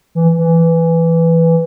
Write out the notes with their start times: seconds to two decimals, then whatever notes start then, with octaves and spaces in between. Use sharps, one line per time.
0.15 E3
0.38 E3